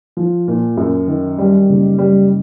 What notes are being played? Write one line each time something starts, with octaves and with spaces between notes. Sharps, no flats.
F3
A#2
F#2
D#3
G3
F#1
G3